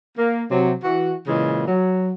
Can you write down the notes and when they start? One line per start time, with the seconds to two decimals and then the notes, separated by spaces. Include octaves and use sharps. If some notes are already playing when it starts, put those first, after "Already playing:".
0.18 A#3
0.51 C3 F#3
0.84 E3 F#4
1.27 A#2 C#3 E3 G#3
1.68 F#3